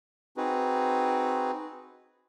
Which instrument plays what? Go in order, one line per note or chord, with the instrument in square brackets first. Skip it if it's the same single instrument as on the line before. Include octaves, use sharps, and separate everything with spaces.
[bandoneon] C4 D#4 F#4 G#4 B4